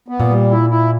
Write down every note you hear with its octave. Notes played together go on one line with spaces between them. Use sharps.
B3
A#2
G3
E4
E4